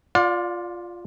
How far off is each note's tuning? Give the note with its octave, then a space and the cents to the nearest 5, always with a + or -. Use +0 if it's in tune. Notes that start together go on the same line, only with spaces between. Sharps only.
F4 +0 D5 +0 F5 +40